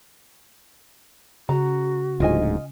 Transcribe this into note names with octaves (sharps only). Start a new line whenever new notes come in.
C#3 F#4 A#5
D1 D2 G#2 F4 D#5 G#5